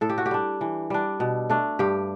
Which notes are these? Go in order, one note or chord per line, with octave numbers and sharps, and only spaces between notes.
A2 A4
G4
F#4
G4
G3 D4
E3
G3 D4
B2
A3 D4
G2 G4